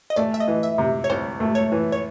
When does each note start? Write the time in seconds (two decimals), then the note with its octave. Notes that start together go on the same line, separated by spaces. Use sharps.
0.10 D#5
0.16 A3 D5
0.34 E5
0.40 D#5
0.48 E3
0.63 E5
0.78 C3
1.04 C#5
1.09 C2 C5
1.40 A3
1.55 C#5
1.72 E3
1.92 C#5